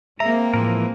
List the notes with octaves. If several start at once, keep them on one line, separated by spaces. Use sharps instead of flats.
G#3 A#3 C4 E5 A#5
A2 E3 F3 A#4